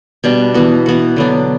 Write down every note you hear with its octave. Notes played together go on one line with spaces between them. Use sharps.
B2 G3 D4
E3 B3 F#4
E3 B3 F#4
D3 F#3 B3 D4